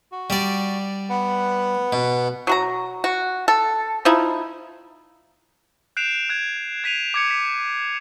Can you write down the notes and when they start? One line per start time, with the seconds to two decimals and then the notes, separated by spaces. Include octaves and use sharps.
0.12 F#4
0.30 G3 D5
1.10 B3 B4 F#5
1.93 B2
2.47 F#3 F#4 A#5
3.04 F#4
3.48 A4
4.05 F3 D#4 E4
5.97 F#6 G6 C7 D7 E7 F7
6.29 F#6 G#6
6.84 G#6 B6 D#7 F7
7.14 D6 G#6 C#7
7.31 B6